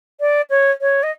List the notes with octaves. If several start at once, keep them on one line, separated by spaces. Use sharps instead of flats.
D5
C#5
C#5
D#5